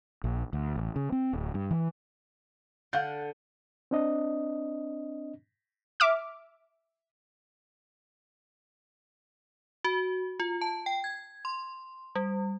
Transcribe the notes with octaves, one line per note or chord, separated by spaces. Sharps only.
A#1
D2
A1
C#3
C4
D1
G2
E3
D3 F5 F#5 G6
C4 D4 D#5
E5 D6 F6
F#4
F4
A5
G5
G#6
C6
G3